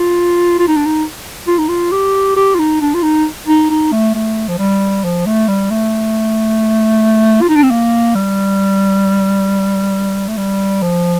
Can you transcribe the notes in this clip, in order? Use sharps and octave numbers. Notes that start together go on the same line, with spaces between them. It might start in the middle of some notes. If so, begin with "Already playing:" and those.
Already playing: F4
F4
D#4
D4
D#4
F4
D#4
F4
G4
G4
F4
D#4
D4
F4
D#4
D#4
D#4
A3
A3
F3
G3
F3
A3
G3
A3
F4
D#4
D4
C4
A#3
G3
A3
G3
F3